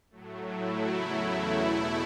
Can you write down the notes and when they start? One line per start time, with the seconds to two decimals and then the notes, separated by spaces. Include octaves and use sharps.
0.11 A2 F#3 A3
0.48 E4
0.84 E2 C#3 F#3 A3 E4
1.21 E4
1.57 E2 B2 A3 E4